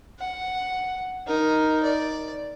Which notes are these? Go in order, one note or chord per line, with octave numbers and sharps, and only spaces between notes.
F#5
D#4 A#4
D5